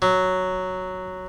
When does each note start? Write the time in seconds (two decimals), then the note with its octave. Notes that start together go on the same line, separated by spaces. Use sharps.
0.02 F#3